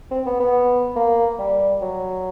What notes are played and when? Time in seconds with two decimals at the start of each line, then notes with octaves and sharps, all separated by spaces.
0.11 C4
0.26 B3
0.40 B3
0.96 A#3
1.39 G3
1.81 F#3